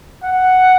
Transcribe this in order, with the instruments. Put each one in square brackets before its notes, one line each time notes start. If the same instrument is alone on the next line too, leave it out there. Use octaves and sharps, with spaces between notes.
[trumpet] F#5